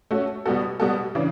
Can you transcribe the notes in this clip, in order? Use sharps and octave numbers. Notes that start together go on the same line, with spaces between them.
A3 C#4 F#4
B2 G3 B3 F#4 A4
B2 G3 B3 F#4 A4
C#3 E3 D4